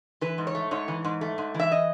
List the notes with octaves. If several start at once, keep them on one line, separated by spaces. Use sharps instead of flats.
E3 B4
G#2
C#5
A3
G#2 C#5
E3
G#2
A3
G#2
E3
E5
D#5